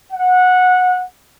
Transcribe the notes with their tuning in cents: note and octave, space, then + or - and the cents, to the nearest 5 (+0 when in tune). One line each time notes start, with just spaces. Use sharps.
F#5 -20